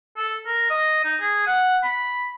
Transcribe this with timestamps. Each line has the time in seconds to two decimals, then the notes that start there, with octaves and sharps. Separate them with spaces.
0.17 A4
0.46 A#4
0.70 D#5
1.04 D#4
1.21 G#4
1.47 F#5
1.83 B5